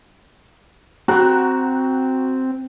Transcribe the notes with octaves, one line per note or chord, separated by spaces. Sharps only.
C4 F#4 A#5 F#6